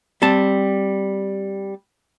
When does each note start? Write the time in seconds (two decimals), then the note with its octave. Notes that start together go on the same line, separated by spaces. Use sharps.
0.22 G3 C4 A5